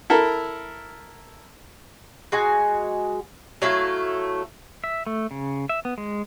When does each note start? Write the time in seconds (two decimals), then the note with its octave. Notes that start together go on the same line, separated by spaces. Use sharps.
0.10 E4 A4 A#4
2.32 G#3 F#4 G#5
3.62 F#3 A3 E4 F5
4.84 E5
5.07 A3
5.31 C#3
5.69 E5
5.85 B3
5.98 G#3